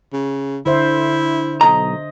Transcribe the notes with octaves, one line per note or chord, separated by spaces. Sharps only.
C#3
D3 E4 C5 E5
B1 D#5 A#5